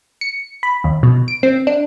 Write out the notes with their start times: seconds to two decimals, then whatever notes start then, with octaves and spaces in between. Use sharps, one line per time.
0.21 C#7
0.63 B5
0.84 D#2
1.03 B2
1.28 D7
1.43 C4
1.67 D4